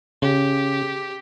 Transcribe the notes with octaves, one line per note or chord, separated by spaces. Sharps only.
C#3 G4